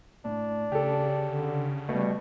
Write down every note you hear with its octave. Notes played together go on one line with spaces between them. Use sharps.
A2 D4
C#3 G4 A4
D3
B2 G3 A3 B3